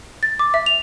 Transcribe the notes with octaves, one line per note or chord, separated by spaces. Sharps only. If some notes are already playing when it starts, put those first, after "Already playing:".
A6
D6
E5
F7